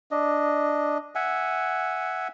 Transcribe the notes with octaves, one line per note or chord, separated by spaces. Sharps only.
D4 D#5
E5 F#5 G#5